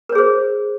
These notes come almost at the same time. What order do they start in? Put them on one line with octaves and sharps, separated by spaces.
A#4 C#5 G#4 C5